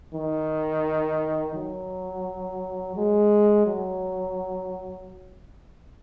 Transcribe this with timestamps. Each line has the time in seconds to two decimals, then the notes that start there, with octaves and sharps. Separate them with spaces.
0.15 D#3
1.55 F#3
2.96 G#3
3.66 F#3